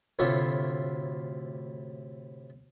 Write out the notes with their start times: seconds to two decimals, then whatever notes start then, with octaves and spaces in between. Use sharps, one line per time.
0.19 D2 A2 C3 F4 C#5